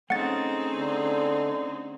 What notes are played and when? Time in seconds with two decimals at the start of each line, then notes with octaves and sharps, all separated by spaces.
0.10 A3 C4 C#4 D#4 G#4 D#5 F#5 A6
0.75 D3